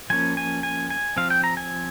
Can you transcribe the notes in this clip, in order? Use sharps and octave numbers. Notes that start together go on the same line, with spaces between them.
F3 A#3 C#4 G#5
G#5
G#5
G#5
F3 C4 F5
G5
A#5
G#5